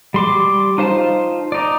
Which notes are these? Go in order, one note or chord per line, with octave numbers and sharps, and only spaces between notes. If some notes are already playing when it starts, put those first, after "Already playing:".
G3 C6 D6
D#4 F4 C5 F5 A5
D#4 D5